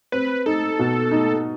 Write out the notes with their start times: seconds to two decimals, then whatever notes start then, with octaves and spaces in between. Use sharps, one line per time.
0.12 C4 B4
0.46 D#4 A4
0.79 B2
1.11 D#4